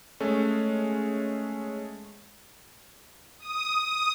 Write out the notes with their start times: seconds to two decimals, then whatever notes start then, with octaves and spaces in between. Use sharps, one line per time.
0.20 G#3 A3 C#4
3.39 D#6
3.80 D#6